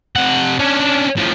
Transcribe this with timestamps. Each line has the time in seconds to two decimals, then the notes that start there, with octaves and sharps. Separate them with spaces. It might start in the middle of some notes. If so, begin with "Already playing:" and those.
0.16 C3 F#5
0.59 C#4 D4
1.17 A2 F3